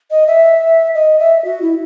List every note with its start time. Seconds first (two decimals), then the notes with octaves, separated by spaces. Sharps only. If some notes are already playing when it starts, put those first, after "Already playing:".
0.10 D#5
0.27 E5
0.94 D#5
1.19 E5
1.44 F#4
1.62 E4